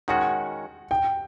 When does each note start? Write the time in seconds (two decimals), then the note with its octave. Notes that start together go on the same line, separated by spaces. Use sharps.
0.08 D#3 G#3 C#4 F#4 F#5
0.91 G5